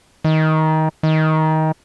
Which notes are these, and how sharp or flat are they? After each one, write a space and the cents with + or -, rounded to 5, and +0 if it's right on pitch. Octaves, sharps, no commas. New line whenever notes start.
D#3 +20
D#3 +20